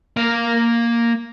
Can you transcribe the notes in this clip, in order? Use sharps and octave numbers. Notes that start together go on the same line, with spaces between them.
A#3 F5